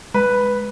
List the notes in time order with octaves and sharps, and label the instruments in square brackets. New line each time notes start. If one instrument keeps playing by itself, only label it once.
[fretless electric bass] G#3 [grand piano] B4